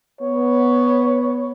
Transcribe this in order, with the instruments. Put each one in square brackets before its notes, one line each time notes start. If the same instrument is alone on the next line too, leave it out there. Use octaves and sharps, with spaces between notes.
[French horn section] B3 [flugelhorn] C#5